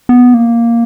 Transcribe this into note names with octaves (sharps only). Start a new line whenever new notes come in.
B3
A#3